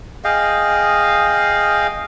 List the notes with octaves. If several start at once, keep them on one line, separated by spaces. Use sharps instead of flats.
G#4 D#5 F5 G5